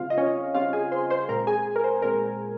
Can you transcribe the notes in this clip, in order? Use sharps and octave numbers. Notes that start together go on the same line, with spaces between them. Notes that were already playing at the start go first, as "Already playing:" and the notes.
Already playing: C#3 G3 C4 F4 F5
D#5
C#4 C#5
C#3 G3 C4 F4 F5
G#4 G#5
C5 C6
C5 C6
A#2 G#3 C4 A#4 A#5
G#4 G#5
A#4
C5
A#2 G#3 C4 A#4